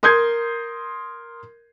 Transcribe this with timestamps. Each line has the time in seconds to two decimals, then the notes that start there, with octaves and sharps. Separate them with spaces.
0.03 A#4 C6 D#6 G6 G#6 C7